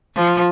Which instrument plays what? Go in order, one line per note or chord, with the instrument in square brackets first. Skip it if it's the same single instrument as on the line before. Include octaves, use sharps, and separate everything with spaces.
[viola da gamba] F3